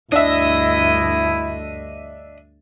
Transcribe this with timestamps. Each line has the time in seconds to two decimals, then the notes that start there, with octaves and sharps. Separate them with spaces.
0.12 D2 G2 D4 E4 D#5 E5